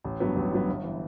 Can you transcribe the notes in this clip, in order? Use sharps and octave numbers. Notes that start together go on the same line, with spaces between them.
A1
G2 F#3 B3
A1
G2 F#3 B3
G1
E3